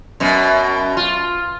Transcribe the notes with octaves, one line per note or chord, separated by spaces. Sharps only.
F#2 B2
F4